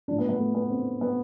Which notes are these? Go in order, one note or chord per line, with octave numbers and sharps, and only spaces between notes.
A2 F3 D4
B3
B3
A3
B3
C4
B3